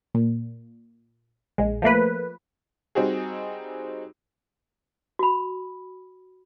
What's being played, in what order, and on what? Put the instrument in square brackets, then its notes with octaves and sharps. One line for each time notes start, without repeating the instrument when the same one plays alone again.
[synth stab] A#2
A#1 G#3
F3 A3 A#3 B4
[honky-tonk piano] G3 C4 D#4 F#4 G#4
[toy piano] F#4 B5